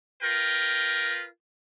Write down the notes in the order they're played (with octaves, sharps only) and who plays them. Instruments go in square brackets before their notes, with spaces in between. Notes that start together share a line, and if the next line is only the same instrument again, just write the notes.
[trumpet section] F4 A#4 B4 G5